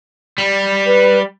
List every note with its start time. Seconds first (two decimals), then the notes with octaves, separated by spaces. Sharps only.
0.38 G3
0.86 B4